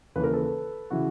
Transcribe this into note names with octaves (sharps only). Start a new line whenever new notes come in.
D#2 C#3 E3 B4
A#4
A4 B4
C#3 E3 E4 F#4